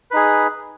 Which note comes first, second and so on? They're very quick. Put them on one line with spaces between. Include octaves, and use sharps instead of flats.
B4 D#4 G#4